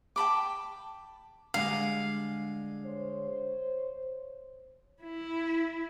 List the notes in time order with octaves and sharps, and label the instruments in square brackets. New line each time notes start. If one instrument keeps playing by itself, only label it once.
[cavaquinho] G5 A5 B5 D6
[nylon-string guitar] D3 G3 G#3 [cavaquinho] F5
[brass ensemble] C5 C#5
[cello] E4